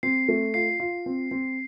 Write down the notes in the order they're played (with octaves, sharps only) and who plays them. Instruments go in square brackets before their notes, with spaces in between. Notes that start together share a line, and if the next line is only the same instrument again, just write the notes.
[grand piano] C4 [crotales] C7
[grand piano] A3
[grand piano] F4 [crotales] C7
[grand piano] F4
C4
C4